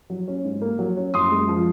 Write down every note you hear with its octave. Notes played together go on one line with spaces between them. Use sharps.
F#3
C#4
G#2
A#3
F#3
C#4
F#2 C6 D#6
G#3
F3